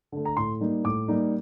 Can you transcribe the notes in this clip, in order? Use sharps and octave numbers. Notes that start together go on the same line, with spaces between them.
D3 A3
A#5
A2 C6
G3 A#3 D#4
A2 D6
G3 A#3 D#4